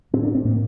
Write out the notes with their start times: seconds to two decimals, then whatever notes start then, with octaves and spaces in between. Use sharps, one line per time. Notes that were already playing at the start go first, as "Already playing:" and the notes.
0.13 A2 C4
0.23 D4
0.35 C4
0.44 A2 A#3